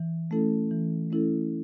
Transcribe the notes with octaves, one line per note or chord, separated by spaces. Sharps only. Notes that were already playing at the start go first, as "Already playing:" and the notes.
Already playing: E3
A3 C#4 E4 A4
E3
A3 C#4 E4 A4